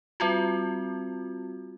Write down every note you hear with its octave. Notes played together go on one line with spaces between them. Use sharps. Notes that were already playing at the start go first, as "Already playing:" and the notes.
G3 C4 F4 F#4